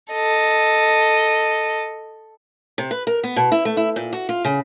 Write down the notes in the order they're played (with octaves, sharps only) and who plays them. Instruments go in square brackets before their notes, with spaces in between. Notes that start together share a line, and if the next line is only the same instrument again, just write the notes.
[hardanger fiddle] A4 D#5
[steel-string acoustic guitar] C3
B4
A#4
B3
B2
E4
A3
E4
A#2
F#4
F4
C#3